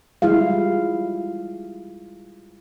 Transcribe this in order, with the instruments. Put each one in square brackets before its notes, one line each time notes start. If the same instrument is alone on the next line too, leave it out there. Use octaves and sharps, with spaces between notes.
[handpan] G3 G#3 E4 F4 G#4 F5